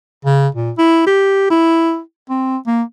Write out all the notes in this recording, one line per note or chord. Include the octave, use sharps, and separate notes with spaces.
C#3
A#2
E4
G4
E4
C4
A#3